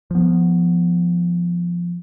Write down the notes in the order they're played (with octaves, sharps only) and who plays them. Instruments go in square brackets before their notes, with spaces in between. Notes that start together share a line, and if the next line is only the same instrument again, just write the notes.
[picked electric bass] F3 B3